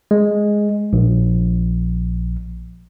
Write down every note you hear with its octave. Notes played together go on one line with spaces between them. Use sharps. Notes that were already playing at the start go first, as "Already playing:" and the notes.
G#3
A#1